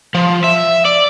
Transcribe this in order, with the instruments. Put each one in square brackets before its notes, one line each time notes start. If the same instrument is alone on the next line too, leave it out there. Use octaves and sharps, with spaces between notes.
[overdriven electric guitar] F3
E5
D5